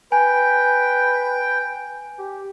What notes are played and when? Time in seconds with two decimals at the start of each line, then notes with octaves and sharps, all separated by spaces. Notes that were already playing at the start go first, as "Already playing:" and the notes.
0.12 B4 G5 G#5
2.19 G4